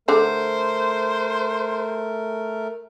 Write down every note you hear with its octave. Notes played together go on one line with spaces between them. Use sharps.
D3 A3 A#4 C5